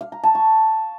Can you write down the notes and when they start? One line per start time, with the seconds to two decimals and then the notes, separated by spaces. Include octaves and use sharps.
0.01 F5
0.12 A#5
0.24 A5
0.35 C#6